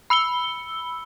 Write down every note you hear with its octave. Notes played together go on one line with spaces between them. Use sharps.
B5 E6 C#7 G7